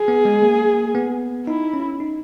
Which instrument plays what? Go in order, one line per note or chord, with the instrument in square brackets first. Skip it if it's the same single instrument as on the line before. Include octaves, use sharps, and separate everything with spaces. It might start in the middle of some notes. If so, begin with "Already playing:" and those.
Already playing: [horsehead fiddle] G#4
[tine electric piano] B3
G#3
A#3
B3
[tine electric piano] D#4 [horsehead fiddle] E4
[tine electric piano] C#4
D#4